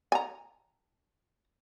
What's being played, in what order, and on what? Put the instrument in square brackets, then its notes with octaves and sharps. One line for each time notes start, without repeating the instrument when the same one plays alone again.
[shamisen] G#5 A#5